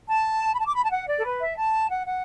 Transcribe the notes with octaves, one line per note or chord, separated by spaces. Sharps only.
A5
B5
A5
D6
B5
A5
F#5
D5
A4
B4
E5
A5
F#5
F#5